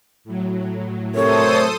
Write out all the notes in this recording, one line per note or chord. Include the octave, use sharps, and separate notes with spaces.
A2 F#3
C3 A3 A4 A#4 C5 C#5 D#6